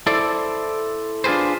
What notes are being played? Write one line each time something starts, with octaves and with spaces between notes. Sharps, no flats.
E4 A4 C5 D5
D4 F4 F#4 G#4 B4 C5